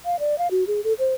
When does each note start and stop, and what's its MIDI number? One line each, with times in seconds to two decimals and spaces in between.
0.05 0.19 77
0.19 0.38 74
0.38 0.48 77
0.51 0.64 66
0.67 0.83 68
0.84 0.93 69
0.99 1.14 72